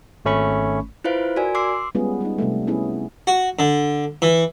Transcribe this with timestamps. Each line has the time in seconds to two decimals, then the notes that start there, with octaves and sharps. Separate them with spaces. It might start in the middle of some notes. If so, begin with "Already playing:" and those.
0.25 G#1 A3 C#4 B5 C#6
1.04 E4 F4 B4 C5 F5
1.36 F#4 A#4 D5 G#5
1.55 C6 D6 E6 C7
1.95 G3 G#3 B3 C#4 F4 G#4
2.21 G3 D#4
2.38 C3 G3 A3
2.67 B3 C#4 E4 G#4
3.27 F#4
3.59 D3
4.22 E3